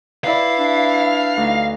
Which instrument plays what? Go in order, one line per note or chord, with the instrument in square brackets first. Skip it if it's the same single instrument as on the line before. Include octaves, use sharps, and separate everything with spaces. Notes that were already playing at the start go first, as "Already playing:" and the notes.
[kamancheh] E4 [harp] B4 D5 [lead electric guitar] F5
[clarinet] D4
[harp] D2 D#4